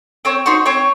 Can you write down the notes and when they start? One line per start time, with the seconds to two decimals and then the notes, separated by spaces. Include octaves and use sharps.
0.25 C4 C#5
0.46 D#4 F#4 C5
0.66 C4 C#5